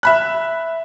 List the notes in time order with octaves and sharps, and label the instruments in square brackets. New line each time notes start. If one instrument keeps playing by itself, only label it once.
[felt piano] E5 B5 F#6